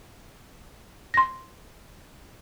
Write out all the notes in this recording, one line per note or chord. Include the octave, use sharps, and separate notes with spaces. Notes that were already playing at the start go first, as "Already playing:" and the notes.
C6 A#6